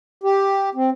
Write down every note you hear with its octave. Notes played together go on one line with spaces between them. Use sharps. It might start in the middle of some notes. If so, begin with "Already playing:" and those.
G4
C4